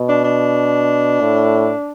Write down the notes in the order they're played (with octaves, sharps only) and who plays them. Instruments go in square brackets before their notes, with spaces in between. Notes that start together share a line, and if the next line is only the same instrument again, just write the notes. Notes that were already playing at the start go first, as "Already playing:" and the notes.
Already playing: [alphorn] B2
[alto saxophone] D4
D4
[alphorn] A2